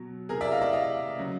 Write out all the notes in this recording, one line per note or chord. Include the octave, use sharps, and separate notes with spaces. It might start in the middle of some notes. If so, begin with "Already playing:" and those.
Already playing: B2 F#3
C3 E3 G#4 A#4
D5 E5
D#5 F5
D5 E5
D#5 F5
C#3 F#3